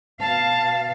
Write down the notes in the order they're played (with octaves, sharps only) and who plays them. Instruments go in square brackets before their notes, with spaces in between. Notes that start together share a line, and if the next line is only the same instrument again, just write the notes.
[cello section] B2 F5 [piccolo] A5